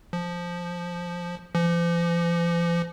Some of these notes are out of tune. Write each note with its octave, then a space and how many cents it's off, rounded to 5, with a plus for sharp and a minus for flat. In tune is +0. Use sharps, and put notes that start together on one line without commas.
F3 +0
F3 -40